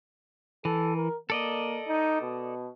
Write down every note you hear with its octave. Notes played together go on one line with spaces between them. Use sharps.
E3 A4
A#4
A#3 A4 D5 D#5
D#4
B2